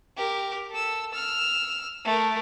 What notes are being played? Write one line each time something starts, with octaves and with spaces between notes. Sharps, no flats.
G4 A#4
A4 E6
E6 F6
A3 A#4